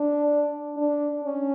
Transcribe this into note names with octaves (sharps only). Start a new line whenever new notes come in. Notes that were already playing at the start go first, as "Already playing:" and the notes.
Already playing: D4
D4
C#4